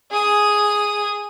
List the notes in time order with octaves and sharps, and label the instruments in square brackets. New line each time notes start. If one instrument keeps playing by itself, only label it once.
[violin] G#4 D#6